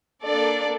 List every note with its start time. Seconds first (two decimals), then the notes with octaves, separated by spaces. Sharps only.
0.23 A#3 D4 A4 D5